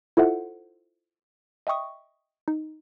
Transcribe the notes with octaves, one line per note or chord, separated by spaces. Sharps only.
E4 F4 A4 C5 E5 F#5
D#5 E5 G5 C#6 D#6
D#4